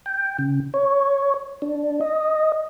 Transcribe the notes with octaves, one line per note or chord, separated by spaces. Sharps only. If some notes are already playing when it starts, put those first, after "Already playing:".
G5
C#3
C#5
D4
D#5